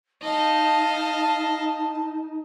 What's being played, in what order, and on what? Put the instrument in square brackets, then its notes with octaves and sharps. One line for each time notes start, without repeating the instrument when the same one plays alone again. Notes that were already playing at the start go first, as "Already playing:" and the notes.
[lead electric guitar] D#4 [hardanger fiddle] D#5 F5 [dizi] A5